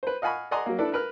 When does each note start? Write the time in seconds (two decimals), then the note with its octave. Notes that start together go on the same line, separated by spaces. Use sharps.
0.03 B4 C5
0.22 D#5 F5 F#5 G#5 B5 C#6
0.51 D5 D#5 F#5 G#5 A#5 C6
0.66 F#3 A#3
0.78 D4 E4 A4 B4
0.92 A#4 B4 F6